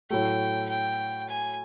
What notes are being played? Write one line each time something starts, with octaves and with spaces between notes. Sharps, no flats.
A2 F#3 A3 G5
G5
G#5